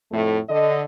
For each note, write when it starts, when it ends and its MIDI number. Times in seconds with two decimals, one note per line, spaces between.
0.12 0.38 41
0.12 0.38 45
0.12 0.38 57
0.49 0.82 50
0.49 0.82 75